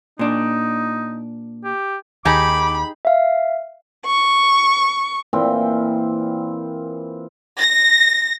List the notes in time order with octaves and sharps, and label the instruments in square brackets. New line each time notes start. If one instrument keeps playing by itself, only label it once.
[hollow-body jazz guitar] A#2 D4 [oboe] D#4
[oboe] G4
[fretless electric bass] D#2 [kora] D#4 G4 G#4 [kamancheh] B5 [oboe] D6
[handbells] E5 F5
[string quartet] C#6
[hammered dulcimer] A#2 E3 C4 G5
[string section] A#6